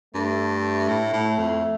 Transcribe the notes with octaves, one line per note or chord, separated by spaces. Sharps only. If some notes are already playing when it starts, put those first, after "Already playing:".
G2 A3
A2
A2
F2